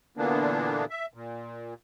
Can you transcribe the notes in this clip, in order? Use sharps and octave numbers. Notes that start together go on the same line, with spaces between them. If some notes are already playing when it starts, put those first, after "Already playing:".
A#2 D3 E3 A#3 B3 D4
E5
A#2